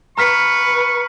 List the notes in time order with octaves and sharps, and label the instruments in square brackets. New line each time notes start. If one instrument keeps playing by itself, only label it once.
[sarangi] B4 [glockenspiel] A#5 F6 B6 [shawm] C#6